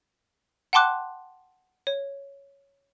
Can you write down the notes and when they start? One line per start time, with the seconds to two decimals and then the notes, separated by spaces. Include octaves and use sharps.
0.73 F#5 G5 A5 C6 D6 F#6
1.87 C#5